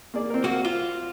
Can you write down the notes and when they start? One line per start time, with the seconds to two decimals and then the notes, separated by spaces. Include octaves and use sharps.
0.14 A#3 G#4 D5
0.30 C4 A#4
0.44 A#3 F#4
0.65 F4